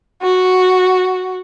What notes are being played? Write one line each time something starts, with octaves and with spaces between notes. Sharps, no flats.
F#4